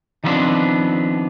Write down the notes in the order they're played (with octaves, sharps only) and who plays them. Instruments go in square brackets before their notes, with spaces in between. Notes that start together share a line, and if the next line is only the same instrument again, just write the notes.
[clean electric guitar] D#3 F3 G3 B3 C4 D4